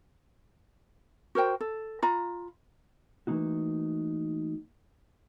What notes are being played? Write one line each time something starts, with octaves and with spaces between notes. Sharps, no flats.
F#4 A#4 C5 G5
A4
F4 A#5 B5
E3 A3 A#3 D#4 F#4